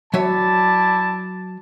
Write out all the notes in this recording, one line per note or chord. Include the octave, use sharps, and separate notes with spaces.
F#3 E4 C#5 D5 E5 A5